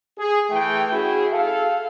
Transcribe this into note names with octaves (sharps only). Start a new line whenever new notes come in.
G#4
E3 A3 G5
C#4 E4 F#4 G#4
A4 F5